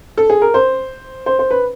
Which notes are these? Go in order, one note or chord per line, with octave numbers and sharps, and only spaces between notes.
A4
G#4
A#4
C5
C5
C5
B4